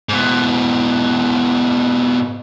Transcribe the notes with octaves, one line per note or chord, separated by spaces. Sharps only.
G#2 B2